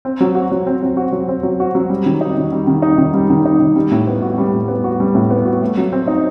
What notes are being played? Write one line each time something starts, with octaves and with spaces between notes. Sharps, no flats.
C4
F#3
F#4
F#3
C4
F#3
F#4
F#3
C4
F#3
F#4
F#3
G3
D#3
D#4
D#3
G3
D#3
D#4
D#3
G3
D#3
D#4
D#3
G3
A2
B3
F#4
G3
A2
B3
F#4
G3
A2
B3
F#4
A3
F#3
C4
D#4